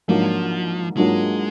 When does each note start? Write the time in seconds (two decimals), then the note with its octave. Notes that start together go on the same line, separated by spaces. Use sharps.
0.08 G#2 F3 F#3 A#3 D4 F4
0.97 G#2 F#3 G#3 A#3 D4 F4